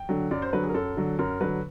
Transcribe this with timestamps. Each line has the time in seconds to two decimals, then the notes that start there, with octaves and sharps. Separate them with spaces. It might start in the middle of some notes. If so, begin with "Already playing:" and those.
Already playing: G5
0.09 D3 F#3
0.31 F#2 D5
0.42 C5
0.53 D3 F#3 B4
0.64 G#4
0.69 A#4
0.74 F#2 A4
0.97 D3 F#3
1.19 F#2 A#4
1.41 D3 F#3 B4